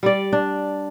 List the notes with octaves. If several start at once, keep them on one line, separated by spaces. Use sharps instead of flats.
G3 D5
D4